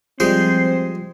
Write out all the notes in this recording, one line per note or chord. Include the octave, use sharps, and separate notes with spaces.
F3 G3 G#3 C4 G#4 C5